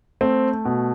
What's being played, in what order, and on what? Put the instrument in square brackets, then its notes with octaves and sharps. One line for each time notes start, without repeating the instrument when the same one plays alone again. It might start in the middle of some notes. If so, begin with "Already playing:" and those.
[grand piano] A3 C4
B2